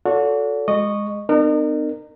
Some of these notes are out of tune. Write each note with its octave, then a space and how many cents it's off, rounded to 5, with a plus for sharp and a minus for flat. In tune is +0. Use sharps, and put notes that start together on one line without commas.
F#4 -30 A4 +0 D5 -45
G#3 -5 D#5 -20 C#6 +0
B3 +45 D#4 -45 A#4 -20